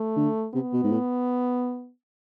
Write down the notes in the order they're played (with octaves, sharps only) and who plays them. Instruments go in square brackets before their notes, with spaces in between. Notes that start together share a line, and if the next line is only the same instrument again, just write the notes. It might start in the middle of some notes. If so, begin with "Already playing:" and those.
Already playing: [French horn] A3
[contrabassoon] D3
[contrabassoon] C3 [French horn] B3
[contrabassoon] B2
G#2
A2